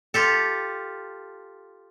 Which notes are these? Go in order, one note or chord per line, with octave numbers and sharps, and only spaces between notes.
F4 G4 A4